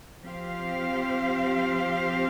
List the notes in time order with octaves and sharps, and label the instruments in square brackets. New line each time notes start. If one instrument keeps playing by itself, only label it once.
[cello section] F3 C4 G4 C5 F5